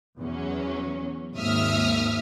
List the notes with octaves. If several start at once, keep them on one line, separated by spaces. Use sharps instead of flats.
E2 F#3 C#4
G#1 D#2 G#2 E5 D#6 F6